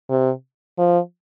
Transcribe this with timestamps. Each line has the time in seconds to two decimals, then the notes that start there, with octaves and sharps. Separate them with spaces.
0.10 C3
0.78 F3